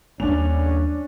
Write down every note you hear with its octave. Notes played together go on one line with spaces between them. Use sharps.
D#2 G3 A#3 C#4 D4 F7